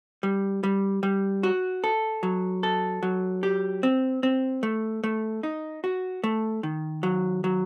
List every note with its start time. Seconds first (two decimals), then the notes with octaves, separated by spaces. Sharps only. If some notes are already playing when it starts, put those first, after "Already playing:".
0.23 G3
0.64 G3
1.03 G3
1.43 F#4
1.84 A4
2.23 F#3
2.63 A4
3.03 F#3
3.43 G4
3.83 C4
4.23 C4
4.63 A3
5.04 A3
5.43 D#4
5.84 F#4
6.24 A3
6.63 D#3
7.03 F#3
7.44 F#3